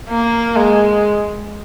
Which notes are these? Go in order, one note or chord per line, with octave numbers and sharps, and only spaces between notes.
A#3
G#3